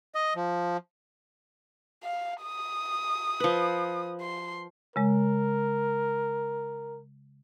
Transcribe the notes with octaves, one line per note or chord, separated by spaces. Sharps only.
D#5
F3
F5
D#6
F3 B4
C6
C#3 G#3 A#4